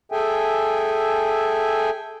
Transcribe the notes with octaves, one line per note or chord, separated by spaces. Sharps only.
G#4 A4 E5 G5 G#5